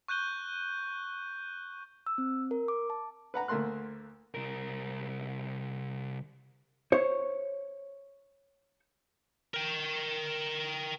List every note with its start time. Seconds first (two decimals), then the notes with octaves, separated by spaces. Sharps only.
0.08 C#6 F#6 G6 D#7 G7
2.06 E6
2.18 C4
2.51 A#4
2.68 D6
2.90 A5
3.34 B4 F#5 A#5 B5
3.48 D2 A3 A#3 A#4 C6 F#6
4.34 C2 A#4
6.92 C5 C#5
9.54 A#4 G5